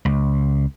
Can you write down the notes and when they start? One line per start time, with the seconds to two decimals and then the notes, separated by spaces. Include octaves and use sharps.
0.05 C#2